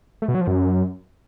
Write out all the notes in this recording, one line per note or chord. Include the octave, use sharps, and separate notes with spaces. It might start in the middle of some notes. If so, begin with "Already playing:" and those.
A3
B2
F#3
F3
F#2